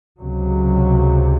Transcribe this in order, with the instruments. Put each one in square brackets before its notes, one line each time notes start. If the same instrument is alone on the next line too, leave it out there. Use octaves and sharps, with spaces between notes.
[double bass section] C#2 C3 F#3